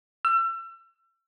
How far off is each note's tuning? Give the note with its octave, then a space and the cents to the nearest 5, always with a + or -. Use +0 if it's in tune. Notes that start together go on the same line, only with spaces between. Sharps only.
E6 +35